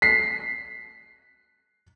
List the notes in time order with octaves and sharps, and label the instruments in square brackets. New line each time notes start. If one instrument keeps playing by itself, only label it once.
[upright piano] B6 C7